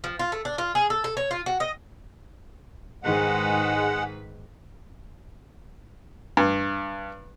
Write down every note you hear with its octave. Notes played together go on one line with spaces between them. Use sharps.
F3
F4
A3
D4
F4
G#4
A4
A4
C#5
F4
F#4
D#5
G#2 D#3 G#3 B4 F#5
G2